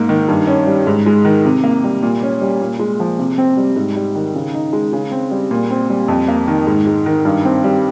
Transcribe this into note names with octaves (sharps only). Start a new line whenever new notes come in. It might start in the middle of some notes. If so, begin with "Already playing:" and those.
Already playing: G#2 A#3
D#3
G2
C#4
G3
G#2
G#3
D#3
C3
A#3
G3
A#2
C#4
G3
A#2
G#3
F3
C3
C4
G3
G#2
G3
D#3
C#3
D#4
G#3
C#3
C4
G3
A#2
C4
G3
F2
A#3
D#3
G#2
G#3
D#3
G2
C4
G3